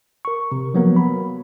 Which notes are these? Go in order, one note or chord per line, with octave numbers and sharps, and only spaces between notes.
A#4 C#6
C3
F3 F#3 A#3 B3 A#4
B5